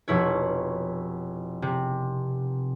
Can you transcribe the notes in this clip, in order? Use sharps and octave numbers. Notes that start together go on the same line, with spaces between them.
F1 B2 E4 C#5
C3